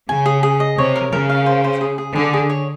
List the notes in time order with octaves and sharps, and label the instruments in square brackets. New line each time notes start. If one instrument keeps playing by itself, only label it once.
[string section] C#3 [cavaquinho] G#5
[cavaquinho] G#4
G#4
D#5
[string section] C3 [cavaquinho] C#5
[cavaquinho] A#4
[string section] C#3 [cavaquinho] A#4
[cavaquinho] F5
C5
C5
G#4
G#4
[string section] D3 [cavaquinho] G#4
[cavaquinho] G#4
C#5